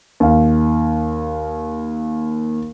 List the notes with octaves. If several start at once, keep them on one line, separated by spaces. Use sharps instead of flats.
D#2 F5